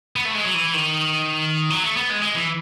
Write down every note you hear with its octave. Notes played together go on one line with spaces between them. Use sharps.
B3
A3
G#3
F#3
E3
D#3
F#3
A3
B3
G#3
G#3
E3